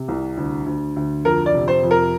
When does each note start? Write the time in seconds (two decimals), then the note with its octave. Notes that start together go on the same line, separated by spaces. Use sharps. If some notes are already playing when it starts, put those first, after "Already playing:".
Already playing: C3
0.08 C2
0.37 D2
0.66 D2
0.96 D2
1.25 F2 A#4
1.46 D5
1.54 C3
1.68 C5
1.83 F2
1.91 A#4